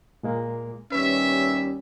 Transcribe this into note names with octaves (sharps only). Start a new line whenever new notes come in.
A#2 G#3 A#3
D#2 G3 C#4 B4 C#5 E5